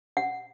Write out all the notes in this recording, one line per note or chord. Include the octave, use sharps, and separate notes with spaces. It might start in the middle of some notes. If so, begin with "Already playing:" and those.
F#5